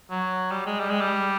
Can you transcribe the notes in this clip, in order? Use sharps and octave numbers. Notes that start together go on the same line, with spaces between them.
F#3
G3
G#3
G3
G#3
G3